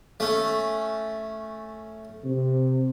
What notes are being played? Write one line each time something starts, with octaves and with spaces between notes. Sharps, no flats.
A3 C#4
C3